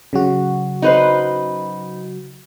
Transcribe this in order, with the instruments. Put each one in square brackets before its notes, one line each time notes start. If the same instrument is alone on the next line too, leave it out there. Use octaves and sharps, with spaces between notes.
[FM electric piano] C#3 F#3 F#4
[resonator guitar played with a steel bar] D#4 B4 C5